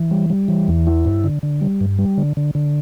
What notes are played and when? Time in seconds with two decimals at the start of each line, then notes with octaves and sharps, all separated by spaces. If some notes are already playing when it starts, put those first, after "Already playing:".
Already playing: E3
0.11 G3
0.30 G3
0.48 E3
0.68 E2
0.87 E4
1.05 G2
1.24 D3
1.43 D3
1.61 G3
1.81 G2
1.99 G3
2.18 D3
2.37 D3
2.55 D3